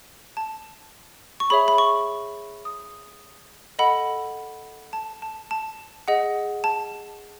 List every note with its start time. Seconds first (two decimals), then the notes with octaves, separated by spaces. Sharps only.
0.37 A5
1.40 C#6
1.50 G#4 C#5 E5 B5
1.68 B5
1.78 C#6
2.65 D#6
3.79 A4 D#5 F#5 B5
4.93 A5
5.22 A5
5.51 A5
6.08 G#4 D#5 F#5
6.64 A5